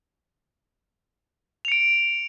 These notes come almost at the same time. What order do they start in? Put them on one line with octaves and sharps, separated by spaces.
F7 C#7 D7